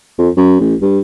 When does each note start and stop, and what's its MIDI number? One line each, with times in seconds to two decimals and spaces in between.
0.18 0.29 41
0.37 0.57 42
0.60 0.75 33
0.82 1.00 43